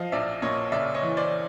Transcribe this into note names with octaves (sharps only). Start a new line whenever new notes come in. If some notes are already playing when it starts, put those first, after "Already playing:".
Already playing: F3 D#5 F5
A#1 D5 E5
A#2 C#5 D#5
C#3 D5 E5
C#5 D#5
E3
C5 D5